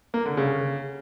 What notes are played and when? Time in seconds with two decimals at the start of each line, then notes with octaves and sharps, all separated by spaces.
0.14 A#3
0.26 D3
0.37 C#3